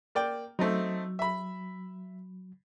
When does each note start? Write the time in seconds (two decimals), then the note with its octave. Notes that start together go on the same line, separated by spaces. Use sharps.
0.15 A#3 D5 G5
0.59 F#3 A3 C4 D#4
1.19 E5 B5